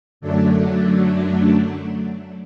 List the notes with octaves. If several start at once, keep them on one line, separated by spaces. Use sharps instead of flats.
F#2 D3 F#3 A3 D4